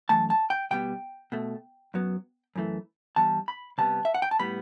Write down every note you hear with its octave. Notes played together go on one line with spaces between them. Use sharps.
F#2 E3 A3 A5
A5
G5
B2 G3 B3 G5
B2 A3
F#2 F#3 B3
F#2 E3 A3
G2 E3 G3 B3 A5
B5
C3 G3 B3 A5
E5
F#5
G5
A5
A2 G3 B3 B5